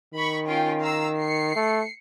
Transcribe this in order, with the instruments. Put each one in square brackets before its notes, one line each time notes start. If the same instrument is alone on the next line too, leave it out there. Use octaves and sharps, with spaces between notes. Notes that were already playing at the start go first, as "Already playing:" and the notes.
[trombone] D#3 [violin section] B5 C#6
[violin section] C#4 F4 G5
F5 A#5 E6
C7 C#7
[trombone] A3